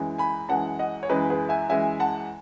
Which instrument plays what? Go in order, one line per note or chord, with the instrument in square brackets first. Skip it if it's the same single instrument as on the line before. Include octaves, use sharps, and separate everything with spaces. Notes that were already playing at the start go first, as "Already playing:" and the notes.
Already playing: [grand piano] F#2 E3 G#3
G#5 B5
F#2 E3 G#3 F#5 A5
D#5 F#5
C#5
F#2 E3 G#3 B4 D#5
G#4 B4
E5 G#5
F#2 E3 G#3 E5 G#5
F#5 A5